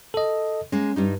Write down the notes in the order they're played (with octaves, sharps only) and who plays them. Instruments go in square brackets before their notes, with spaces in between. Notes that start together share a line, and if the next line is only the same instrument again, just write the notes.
[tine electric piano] A4 D#5
[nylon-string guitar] G#3 A#3 [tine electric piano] C#4
[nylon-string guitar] G2 G3 D#4